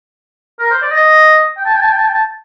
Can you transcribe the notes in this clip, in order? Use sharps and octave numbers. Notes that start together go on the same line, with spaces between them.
A#4
C5
D5
D#5
G5
A5
G5
A5
G5
A5
G5
A5